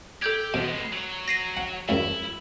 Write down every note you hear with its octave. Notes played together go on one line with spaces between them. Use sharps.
G4 A4 G6 G#6
B2 G#3 B3
F#3 C#5
A#6 C7 D#7
F#5
C#2 F#2 E4